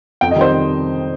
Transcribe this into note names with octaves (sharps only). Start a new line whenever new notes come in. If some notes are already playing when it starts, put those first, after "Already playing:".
F2 G5
D#5
D#3 G3 C4 C5